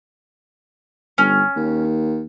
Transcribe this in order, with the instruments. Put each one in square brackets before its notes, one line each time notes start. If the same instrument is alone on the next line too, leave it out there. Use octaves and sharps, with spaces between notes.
[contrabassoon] G1 [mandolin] C#4
[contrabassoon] D#2